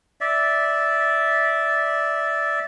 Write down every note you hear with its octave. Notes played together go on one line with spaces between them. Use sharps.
D5 E5